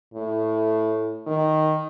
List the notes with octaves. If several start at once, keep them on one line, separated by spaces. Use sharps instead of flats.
A2
D#3